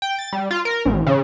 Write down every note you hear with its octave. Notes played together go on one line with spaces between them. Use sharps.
G5
A6
G3
F4
A#4
A1
C#3